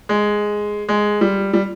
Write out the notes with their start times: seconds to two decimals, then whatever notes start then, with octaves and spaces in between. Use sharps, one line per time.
0.09 G#3
0.89 G#3
1.21 G3
1.53 G3